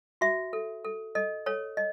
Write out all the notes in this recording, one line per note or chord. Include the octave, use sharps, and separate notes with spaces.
F#4 E5
A4
A4
A4 D#5
A4 C#5
D#5